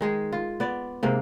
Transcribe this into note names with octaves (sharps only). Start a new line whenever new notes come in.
D#3 G#3 G#4
F4
B3 D5
G#2 C3 A#3